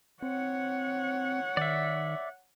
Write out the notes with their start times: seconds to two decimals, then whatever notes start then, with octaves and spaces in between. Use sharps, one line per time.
0.22 C4 C#5 F#5
1.57 D#3 D5 E5